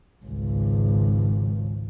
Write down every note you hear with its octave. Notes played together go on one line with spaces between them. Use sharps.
G#1 C#2